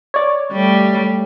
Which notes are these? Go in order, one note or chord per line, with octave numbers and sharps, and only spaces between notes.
C#5 D5
G3 A3